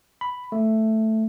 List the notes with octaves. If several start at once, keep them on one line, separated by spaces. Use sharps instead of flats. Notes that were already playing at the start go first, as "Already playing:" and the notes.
B5
A3